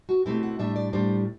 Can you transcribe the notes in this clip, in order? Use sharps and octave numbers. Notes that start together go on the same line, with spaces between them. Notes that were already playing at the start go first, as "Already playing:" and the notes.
F#4
B2 A3 C4 E4 G4
F#5
A2 G3 D4 E5
D5
A2 G3 D4 C5